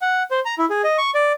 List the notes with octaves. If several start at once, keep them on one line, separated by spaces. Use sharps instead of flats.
F#5
C5
A#5
E4
G#4
D#5
C#6
D5